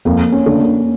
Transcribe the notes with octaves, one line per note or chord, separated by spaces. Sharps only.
F2 A#3
C#4
D3 A3 D4
A#3